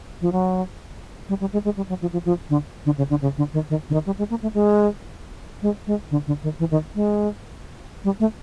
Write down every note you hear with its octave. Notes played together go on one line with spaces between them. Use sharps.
F3
F#3
G3
G3
G#3
G#3
G3
F#3
F3
F3
F3
D3
D3
C#3
D3
C#3
D3
D#3
D#3
D3
D#3
G3
G#3
A#3
A3
G#3
G#3
G#3
D3
D3
D#3
E3
D#3
G#3
G3
A3